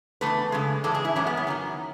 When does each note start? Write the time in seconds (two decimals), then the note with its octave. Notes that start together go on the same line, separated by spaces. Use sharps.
0.21 D#3 A3 B4
0.26 E2
0.52 F#2 C#3 G#3
0.84 A2 E3 G#3 A4
0.94 G#4
1.05 E4
1.16 F#2 E3 G#3 C#4
1.27 B3
1.37 B3
1.47 F#2 D#3 F#3